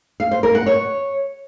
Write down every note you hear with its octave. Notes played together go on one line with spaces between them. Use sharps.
F5
C5
A#4
F#5
C#5